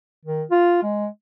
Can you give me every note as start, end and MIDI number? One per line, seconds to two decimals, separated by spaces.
0.25 0.43 51
0.51 0.81 65
0.83 1.08 56